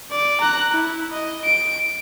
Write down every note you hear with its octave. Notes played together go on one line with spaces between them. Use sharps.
D5
A#5 F#6
E4
D#5
D7